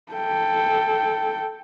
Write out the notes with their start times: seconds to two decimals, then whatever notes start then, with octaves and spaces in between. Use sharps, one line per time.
0.12 A4 G5